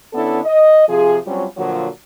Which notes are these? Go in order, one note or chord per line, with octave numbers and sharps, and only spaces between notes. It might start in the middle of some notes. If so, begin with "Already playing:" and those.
D3 B3 C#4 D4 E4 A4
D#5
C3 F3 F4 G#4
F#3 G3 C4 C#4 F4
A#2 D3 F3 F#3